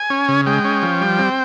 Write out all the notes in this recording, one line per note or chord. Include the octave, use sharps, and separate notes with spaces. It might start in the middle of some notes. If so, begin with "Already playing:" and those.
Already playing: G#5
C#4
C#3
G#3 G5
C#4
F3
G3
C4